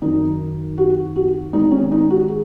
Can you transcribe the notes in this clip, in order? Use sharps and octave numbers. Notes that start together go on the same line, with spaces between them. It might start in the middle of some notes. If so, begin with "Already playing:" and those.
F#2 D#3 D#4
F#4
F#4
G#2 D#3 D#4
C#4
D#4
F#4
G#4